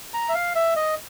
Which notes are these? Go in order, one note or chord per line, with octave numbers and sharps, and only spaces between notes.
A#5
E5
F5
E5
D#5